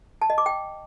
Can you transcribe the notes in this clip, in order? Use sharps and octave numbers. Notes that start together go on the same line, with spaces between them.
A5
D#5
D6
G5